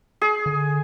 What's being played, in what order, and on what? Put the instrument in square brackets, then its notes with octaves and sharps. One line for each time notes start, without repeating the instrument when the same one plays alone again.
[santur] G#4
[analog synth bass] D3